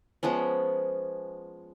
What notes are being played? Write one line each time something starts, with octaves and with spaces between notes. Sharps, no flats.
F3 G#3 B3 C#4